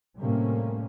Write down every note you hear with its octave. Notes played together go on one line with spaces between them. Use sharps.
A2 C3 G3 A#3 C#4